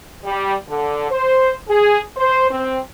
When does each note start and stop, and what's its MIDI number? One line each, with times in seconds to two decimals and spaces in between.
0.25 0.54 55
0.69 1.07 50
1.10 1.54 72
1.68 1.99 68
2.16 2.48 72
2.49 2.78 60